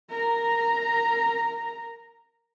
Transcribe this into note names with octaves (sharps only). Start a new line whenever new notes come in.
A#4 A#5